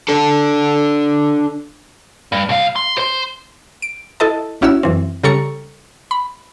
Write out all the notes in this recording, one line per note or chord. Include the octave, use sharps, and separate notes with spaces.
D4 A4
G2
C2 F5
C6
C5 C6
D7
E4 A4 D#5 A5
G#1 C#4 E4 F#4 C#5 E6
F#2 E3 C4
C#3 G3 A4 A#5 C#6 C#7
B5